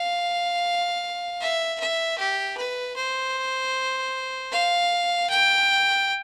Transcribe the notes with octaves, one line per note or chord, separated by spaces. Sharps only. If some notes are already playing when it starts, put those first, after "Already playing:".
Already playing: F5
E5
E5
G4
B4
C5
F5
G5